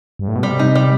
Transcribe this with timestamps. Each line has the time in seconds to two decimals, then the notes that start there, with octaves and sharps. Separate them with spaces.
0.19 G2
0.28 A2
0.35 B2
0.42 C3 G3
0.59 D#4
0.75 G3